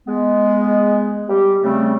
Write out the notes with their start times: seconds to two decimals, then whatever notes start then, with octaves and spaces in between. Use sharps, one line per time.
0.07 G#3 B3
1.28 G3 G4
1.63 C#3 G3 A3 C4